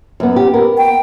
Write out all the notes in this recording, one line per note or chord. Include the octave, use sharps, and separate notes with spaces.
F#2 B3
G4
B3 A#4
G5